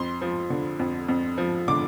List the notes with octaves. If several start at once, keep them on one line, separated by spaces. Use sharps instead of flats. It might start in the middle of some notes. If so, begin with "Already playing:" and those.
Already playing: F2 C6
F3
D3
F2
F2
F3
D3 D6